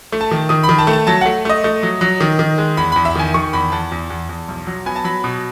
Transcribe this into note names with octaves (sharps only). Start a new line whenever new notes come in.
A3
A5
D#3
D#3 D#6
B5
D#3
A5
A3
A5
F#3 A5
A3 F#5
A3 D#5
A3
F#3
F#3
D#3
D#3
G#3
E2 B5
E2 B5
E5
D#3 G#5
D#3 C#6
E2 B5
E2 A5
E2
E2
E2
B1
F#3
B3 G#5
A5
F#3 B5
B2